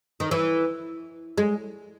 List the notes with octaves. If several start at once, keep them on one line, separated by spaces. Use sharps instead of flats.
D#3
E3
G#3